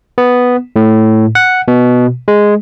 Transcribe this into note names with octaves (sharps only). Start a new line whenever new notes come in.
B3
A2
F#5
B2
G#3